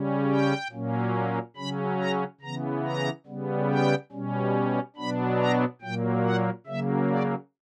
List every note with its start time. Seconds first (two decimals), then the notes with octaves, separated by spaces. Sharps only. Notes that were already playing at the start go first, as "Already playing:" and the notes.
Already playing: C#3 G3 C#4
0.29 G5
0.71 A#2 F#3 A#3 C#4
1.56 C#3 F#3 C#4 B5
1.98 A#5
2.41 C#3 E3 B3 A#5
2.84 A#5
3.26 C#3 G3 B3
3.69 G5
4.12 B2 G3 C#4
4.96 B2 F#3 B3 D4 B5
5.39 A#5
5.81 A#2 F#3 A#3 G5
6.24 F#5
6.67 C#3 F#3 A#3 E5
7.10 D5